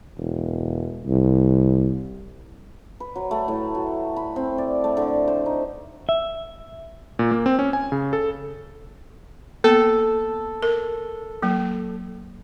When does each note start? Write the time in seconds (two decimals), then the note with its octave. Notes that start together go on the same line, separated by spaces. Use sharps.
0.17 E1
1.06 C2
3.00 B4
3.15 F#3
3.31 A3
3.48 A2
3.75 F#4
4.16 B5
4.36 C4
4.58 D5
4.84 A3
4.97 D3
5.28 C5
5.46 D#4
6.09 E5
7.19 A#2
7.31 A#3
7.46 C4
7.59 C#4
7.73 G#5
7.92 C#3
8.13 A4
9.64 A#3 B3 A4
10.63 A#4
11.42 F#3 A#3